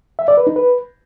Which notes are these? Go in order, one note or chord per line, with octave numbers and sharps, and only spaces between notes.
E5
D5
B4
D#4
B4